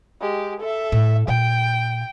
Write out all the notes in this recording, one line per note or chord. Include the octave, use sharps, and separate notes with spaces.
G#3 G4
A4 E5
A2
A#2 A#3 G5